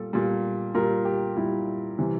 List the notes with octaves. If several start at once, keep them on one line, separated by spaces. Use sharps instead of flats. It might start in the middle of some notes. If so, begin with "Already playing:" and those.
Already playing: A#2 G3 A4
A#2 G3
A#2 G3 A#4
G4
A#2 G3 E4
C3 E3 G3